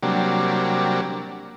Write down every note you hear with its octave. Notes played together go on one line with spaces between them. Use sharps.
C3 F#3 G3 A#3 D4